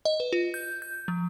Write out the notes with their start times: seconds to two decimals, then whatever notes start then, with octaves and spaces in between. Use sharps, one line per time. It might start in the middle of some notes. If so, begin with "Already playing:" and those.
0.05 D#5
0.20 B4
0.33 F4
0.54 G6
0.82 G6
1.08 F3